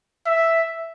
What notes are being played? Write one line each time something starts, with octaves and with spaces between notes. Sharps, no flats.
E5